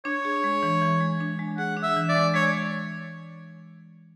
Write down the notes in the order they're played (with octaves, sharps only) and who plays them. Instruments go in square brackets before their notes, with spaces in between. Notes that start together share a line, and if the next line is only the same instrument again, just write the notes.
[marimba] D4 [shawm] C#5
[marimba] G#4
G#3
E3
E3
G#3
D4
G#3
[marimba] G#4 [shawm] F#5
[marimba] D4
[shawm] E5
[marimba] E3
[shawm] D5
[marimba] G#3
[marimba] G#3 [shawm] C#5